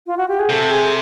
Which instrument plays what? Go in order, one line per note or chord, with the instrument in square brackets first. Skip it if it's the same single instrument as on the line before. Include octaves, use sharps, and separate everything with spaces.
[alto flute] F4
F#4
G4
G#4
[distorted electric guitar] C3 [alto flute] A4
[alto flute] G#4